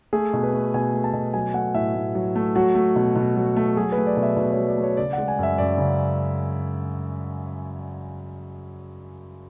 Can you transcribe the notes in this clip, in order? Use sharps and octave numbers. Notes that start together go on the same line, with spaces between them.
A3 G#4
B2
B4
A3
B2 G#5
A3
A5
B2
F#3 G#5
A3 F#5
A2 E5
A2
F#3
A3
F#3 F#4
A3
B2
B2
F#3
A3
F#3 G#4
B4
A3
D5
B2
E5
B2
C#5
F#3
D5
A3
C#5
C#3 D5
G#3 F#5
G#5
F#2 E5
F#2 D5
C#3